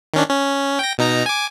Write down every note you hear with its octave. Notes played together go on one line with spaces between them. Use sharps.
D#3 C#4 D4
C#4
G5 A#6
B2 D#4 A#5
G#5 D6